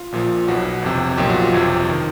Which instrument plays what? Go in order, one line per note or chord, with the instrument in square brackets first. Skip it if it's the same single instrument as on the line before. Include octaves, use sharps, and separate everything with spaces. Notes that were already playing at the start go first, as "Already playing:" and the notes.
Already playing: [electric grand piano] F4
A#1 A#2 F3
B1 B2 F#4
G1 F2 C3
B1 A#2 F3 G4
F#4
F4
G1 F2 C3
D#3